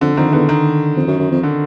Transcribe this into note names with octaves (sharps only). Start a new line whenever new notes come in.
F2 D3
F2 D#3
E2 D3
D#3
F2
F#2
F#2
F2
D3